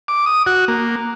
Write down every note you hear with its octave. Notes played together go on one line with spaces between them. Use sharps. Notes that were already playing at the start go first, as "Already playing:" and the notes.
D6
D#6
F#4
A#3